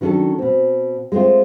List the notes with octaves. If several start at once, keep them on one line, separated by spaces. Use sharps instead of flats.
D#3 F#3 C#4 D4 A4
B2 C4
G#3 A3 B3 C4 F4